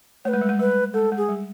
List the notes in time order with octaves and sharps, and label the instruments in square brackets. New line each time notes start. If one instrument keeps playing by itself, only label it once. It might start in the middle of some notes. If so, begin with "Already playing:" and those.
[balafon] A3 [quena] C#5
[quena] B4
[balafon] G#3
G3
G#3
[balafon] G3 [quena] B4
[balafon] G#3 [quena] A4
[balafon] G#3
[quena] G#4
[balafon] G3